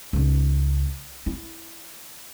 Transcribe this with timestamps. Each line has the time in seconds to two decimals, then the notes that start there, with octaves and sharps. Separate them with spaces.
0.13 C#2 D#4
1.26 E4